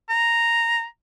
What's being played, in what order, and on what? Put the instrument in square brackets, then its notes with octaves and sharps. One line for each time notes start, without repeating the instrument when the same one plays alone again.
[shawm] A#5